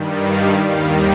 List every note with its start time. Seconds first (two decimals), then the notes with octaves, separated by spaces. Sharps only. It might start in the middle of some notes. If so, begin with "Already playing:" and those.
Already playing: G2 D#3 G3
0.25 F5
0.65 D#2 D#3 G3 F5